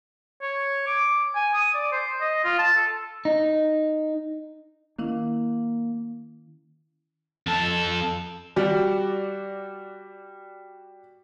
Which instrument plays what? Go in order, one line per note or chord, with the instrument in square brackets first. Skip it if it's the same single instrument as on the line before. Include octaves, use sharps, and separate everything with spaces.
[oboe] C#5
D6
G#5
D#6
D5
C5
D#5
F4
A5
A4
[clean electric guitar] D#4
[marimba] D#3 C#4 E4 [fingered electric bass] A#3
[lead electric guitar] F2 A4
[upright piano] G3 F#4 D5